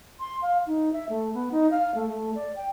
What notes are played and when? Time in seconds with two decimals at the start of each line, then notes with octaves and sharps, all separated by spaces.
0.20 C6
0.42 F5
0.67 D#4
0.93 E5
1.09 A3
1.34 B3
1.52 D#4
1.71 F5
1.95 A3
2.09 A3
2.35 D5
2.56 G5